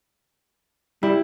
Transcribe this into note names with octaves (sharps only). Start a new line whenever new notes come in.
G3 E4